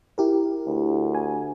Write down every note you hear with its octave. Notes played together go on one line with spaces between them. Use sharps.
E4 G4 A#4
D2
G#5